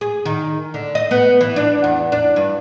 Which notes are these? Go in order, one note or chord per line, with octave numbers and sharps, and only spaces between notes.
G#4
D#3
D3
D#5
B3
E3
D4
E2
D4
G2